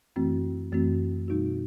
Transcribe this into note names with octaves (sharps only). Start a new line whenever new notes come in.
F#2 E3 A3 C4 F#4
F#2 E3 A3 C4 F#4
B2 G3 D#4 F#4